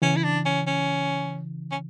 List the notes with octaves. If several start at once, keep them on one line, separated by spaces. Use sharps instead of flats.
C#3 E3 C#4
E4
D4
C#4
C#4
C#4